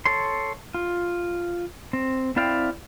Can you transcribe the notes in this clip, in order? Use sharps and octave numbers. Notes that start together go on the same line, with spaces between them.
A4 C#5 C6
F4
C4
C4 E4 D5 F5 G5